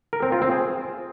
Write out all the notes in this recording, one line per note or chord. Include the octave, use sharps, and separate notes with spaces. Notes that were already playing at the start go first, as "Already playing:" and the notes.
A#4
C4
F4
C4
G#4